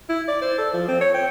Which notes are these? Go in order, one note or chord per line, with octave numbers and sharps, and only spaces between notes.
E4
D5
C5
A4
F3
C4
C#5
G5